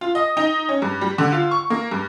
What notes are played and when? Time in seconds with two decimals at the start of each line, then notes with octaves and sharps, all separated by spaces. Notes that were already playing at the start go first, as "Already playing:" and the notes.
0.01 F4
0.15 D#5
0.37 D#4
0.69 C#4
0.82 G2
1.01 G3
1.18 D3
1.32 F4
1.51 C#6
1.70 A#3
1.91 G2